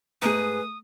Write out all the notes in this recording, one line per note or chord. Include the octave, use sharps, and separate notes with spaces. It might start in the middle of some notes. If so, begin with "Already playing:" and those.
G#2 A3 G#4 B4 A#5 D#6